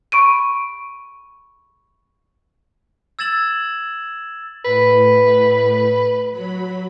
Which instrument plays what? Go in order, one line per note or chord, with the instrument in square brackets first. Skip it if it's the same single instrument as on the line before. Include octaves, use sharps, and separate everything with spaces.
[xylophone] B5 C#6 D7 D#7
[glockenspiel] E6 G#6 A6 E7 F#7
[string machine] A2 [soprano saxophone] B4
[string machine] F#3 B5